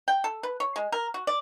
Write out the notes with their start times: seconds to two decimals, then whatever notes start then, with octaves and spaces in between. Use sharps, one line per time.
0.08 G5
0.24 A4
0.43 B4
0.60 C#5
0.76 G#3
0.92 A#4
1.14 F#4
1.27 D5